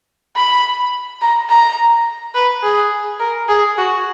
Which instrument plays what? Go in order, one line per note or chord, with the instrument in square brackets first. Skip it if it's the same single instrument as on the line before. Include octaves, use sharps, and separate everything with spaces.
[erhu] B5
A#5
A#5
B4
G#4
A#4
G#4
F#4